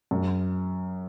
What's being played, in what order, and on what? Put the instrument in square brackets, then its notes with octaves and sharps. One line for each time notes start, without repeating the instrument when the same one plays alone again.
[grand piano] F#2